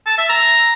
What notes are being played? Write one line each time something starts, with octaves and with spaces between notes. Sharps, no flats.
A5
E5
A#5